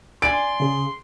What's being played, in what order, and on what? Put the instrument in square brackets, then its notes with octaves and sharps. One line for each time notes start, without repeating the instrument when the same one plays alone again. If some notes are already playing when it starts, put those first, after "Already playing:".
[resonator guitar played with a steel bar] D5 G#5 [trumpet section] C6 [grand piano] D7
[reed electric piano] C#3 G#4